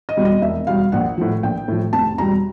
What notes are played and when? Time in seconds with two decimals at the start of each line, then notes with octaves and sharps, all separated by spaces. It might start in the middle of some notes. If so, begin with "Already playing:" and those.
0.09 D#5
0.17 E2 B2 G3
0.25 D#5
0.42 E1 E5
0.67 E2 B2 G3 F5
0.92 A#1 F#5
1.18 A2 F3
1.43 A#1 G5
1.68 A2 F3
1.93 F1 A5
2.18 E2 B2 G3 A#5